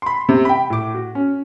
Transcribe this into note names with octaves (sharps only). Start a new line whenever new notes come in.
B5 C6
C3
G5 B5
A2 D6
F#4
C#4